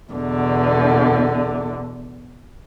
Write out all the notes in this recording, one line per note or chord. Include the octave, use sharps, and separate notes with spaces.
E2 B2 D3